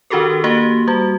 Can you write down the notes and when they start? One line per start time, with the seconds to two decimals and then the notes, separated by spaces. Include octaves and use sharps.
0.10 D#3 D4 F#4 G4 A4 A#4
0.44 A#3 F#4 G4
0.88 G3 F#4